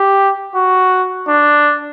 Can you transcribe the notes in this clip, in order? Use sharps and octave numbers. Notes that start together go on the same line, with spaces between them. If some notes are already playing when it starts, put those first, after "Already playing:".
Already playing: G4
F#4
D4